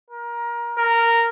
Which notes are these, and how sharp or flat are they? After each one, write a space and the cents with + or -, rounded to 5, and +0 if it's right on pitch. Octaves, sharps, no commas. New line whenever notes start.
A#4 +25
A#4 -10